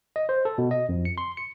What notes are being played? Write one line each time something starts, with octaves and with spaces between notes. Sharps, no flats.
D#5
C5
A4
B2
D#5
F2
C#7
C6
C#7